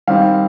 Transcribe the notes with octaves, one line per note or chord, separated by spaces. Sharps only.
D#3 G3 C4 F5